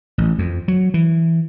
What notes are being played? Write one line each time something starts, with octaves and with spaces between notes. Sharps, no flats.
A1
F2
F#3
E3